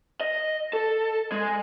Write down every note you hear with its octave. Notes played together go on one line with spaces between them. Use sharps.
D#5
A4
G#3